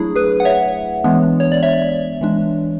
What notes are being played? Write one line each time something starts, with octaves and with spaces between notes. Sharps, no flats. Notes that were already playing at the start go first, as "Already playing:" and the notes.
Already playing: F#3 A3 D4 E4 G#4
G#4 B4
F#5
C#5 E5
E3 G#3 B3 D4
C#5
D5
C#5 E5
E3 G#3 D4